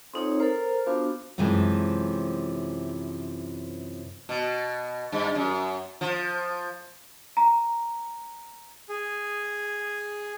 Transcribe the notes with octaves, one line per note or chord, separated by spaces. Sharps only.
F2 C4 D#4 C#5
A4 A#4 C5
F3 B3 D4 F#4
F#2 C3 E3 F3 G#3
B2
G2
F#2
F3
A#5
G#4